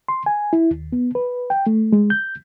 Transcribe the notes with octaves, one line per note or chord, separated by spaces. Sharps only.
C6
G#5
E4
D#2
B3
B4
G5
A3
G#3
G6